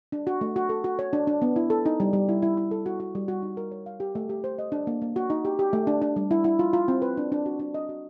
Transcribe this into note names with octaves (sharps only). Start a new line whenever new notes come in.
D4
F#4
A3
F#4
A4
F#4
C#5
D4
D4
B3
E4
A4
D#4
G3
G3
E4
E4
E4
A4
F#4
F#4
G3
F#4
D#4
A#4
C#5
F5
G4
A3
G4
C5
D#5
D4
A#3
A#3
F#4
D#4
G4
G4
A3
D4
D4
G3
E4
E4
F4
F4
C4
B4
D4
D4
F#4
D4
D#5
F#4